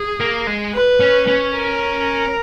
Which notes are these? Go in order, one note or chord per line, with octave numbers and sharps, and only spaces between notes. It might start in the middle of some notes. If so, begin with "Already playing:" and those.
Already playing: G#4
A#3
G#3
B4
C#4
C#4
A#4